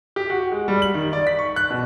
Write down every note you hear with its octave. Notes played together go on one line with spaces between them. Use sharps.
G4
F#4
G#3
G3
F#7
D#3
D5
B6
C#6
F#6
B2